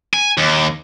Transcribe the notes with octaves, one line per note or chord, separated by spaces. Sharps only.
G#5
D#2